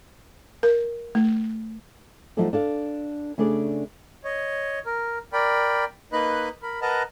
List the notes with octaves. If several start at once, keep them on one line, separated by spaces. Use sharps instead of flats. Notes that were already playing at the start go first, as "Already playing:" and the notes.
A#4
A3
F3 F#3 A3 D#4 A4 D5
D4 A4 F5
C#3 A3 D4 G#4 D5
C#5 D#5
A#4
A#4 D5 G5 B5
A#3 D#4 B4 D#5 B5 F#6
A#4 B5
A#4 B4 D#5 F#5 A5 A#5